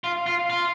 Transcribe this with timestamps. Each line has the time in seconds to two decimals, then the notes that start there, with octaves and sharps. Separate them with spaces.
0.04 F4
0.26 F4
0.50 F4